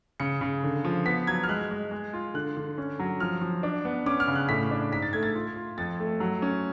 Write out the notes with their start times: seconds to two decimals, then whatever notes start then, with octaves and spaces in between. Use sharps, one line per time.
0.20 C#3 C#7
0.41 C#3
0.64 D3
0.85 F3
1.06 B3 B6
1.27 F#3 G#6
1.43 F6
1.49 G#3 F#6
1.71 G#3
1.91 G#3
2.13 F4
2.34 D3 F#6
2.57 D3
2.78 C#4
2.99 F#3
3.20 F3 F6
3.41 F3
3.63 D4
3.85 B3
4.06 C#4 D6
4.20 F6
4.28 C#3
4.36 F#6
4.49 A2 B6
4.71 D4
4.92 G#2 B6
5.02 A6
5.13 A3 G#6
5.23 A6
5.35 F4
5.56 F4
5.78 F2 A6
6.00 A3
6.20 F#3
6.42 C#4